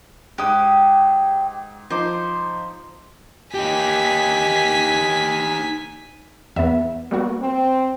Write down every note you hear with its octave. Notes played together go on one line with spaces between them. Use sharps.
G#2 G4 D#6 F#6
F3 D#4 C5 D6
D#4 G4 G#5 B6
E2 B3 E5
G3 A#3 B3 F#4
C4